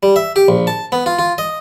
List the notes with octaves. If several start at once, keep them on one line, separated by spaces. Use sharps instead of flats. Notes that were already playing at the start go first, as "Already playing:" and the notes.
G3
E5
G4
A#1
A5
B3
F4
F4
D#5